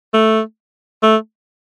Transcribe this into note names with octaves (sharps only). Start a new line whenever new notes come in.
A3
A3